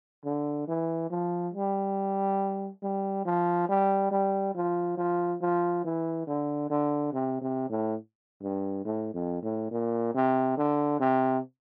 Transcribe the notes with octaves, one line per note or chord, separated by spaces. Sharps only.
D3
E3
F3
G3
G3
F3
G3
G3
F3
F3
F3
E3
D3
D3
C3
C3
A2
G2
A2
F2
A2
A#2
C3
D3
C3